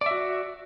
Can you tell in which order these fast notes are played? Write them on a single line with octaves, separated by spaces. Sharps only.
D5 E5 F#4